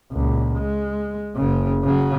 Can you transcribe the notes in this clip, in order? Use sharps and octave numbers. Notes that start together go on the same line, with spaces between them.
C#2 A#2
G#3
F#1 C#3
C#3 F#3